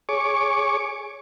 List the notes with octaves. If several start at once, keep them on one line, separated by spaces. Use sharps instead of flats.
G#4 C#5 C#6 D6